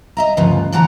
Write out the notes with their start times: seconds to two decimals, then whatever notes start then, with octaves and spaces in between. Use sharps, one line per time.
0.17 D#5 E5 A#5
0.37 D2 G2 C#3 F3 B3 F4
0.72 A2 D3 E3 F#3 F#5 A#5